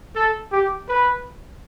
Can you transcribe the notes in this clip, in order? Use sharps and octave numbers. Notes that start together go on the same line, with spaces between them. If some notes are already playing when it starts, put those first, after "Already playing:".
A4
G4
B4